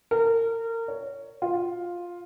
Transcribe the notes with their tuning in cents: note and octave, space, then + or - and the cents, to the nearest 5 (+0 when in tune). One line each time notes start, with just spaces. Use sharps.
A#4 -30
C#5 +10
F4 +5